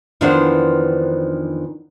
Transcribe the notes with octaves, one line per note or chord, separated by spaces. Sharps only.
F2 D#3 E3 B3 D4 C5